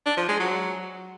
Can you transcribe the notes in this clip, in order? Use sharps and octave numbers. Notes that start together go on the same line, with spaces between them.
D4
F3
G#3
F#3